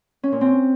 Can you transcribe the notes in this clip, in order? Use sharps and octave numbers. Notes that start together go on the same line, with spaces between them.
C#4
A#2
C4